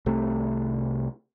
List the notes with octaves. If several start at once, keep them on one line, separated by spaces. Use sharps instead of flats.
C2 C3 A3